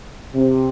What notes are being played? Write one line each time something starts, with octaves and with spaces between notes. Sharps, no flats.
C3